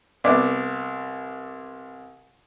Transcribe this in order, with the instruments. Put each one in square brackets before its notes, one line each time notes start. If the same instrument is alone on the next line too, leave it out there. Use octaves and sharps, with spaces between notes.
[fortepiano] C2 B3 D5